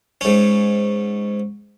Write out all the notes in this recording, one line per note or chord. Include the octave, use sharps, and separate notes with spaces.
G#2 C#4